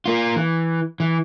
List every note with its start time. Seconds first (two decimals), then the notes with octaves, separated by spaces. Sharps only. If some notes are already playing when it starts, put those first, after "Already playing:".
0.06 A#3 F4
0.36 E3
1.00 E3